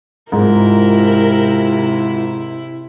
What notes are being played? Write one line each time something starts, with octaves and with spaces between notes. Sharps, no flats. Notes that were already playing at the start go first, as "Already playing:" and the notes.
G#2 C3 E4 F4 A#4